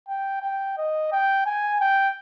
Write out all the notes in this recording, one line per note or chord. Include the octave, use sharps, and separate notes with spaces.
G5
G5
D#5
G5
G#5
G5